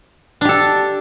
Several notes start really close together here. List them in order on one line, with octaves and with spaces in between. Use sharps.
D4 G4 A4